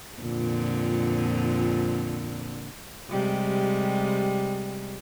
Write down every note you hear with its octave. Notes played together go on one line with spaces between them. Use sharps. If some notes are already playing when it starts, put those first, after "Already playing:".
F2 A#2 D3
C3 G3 G#3